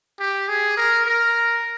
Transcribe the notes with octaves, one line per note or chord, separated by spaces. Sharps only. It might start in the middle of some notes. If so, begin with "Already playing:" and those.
G4
G#4
A#4
A#4